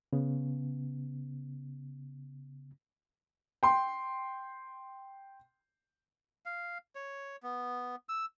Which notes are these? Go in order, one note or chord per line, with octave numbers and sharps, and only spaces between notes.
C#3 B3
G5 C6
F5
C#5
B3
E6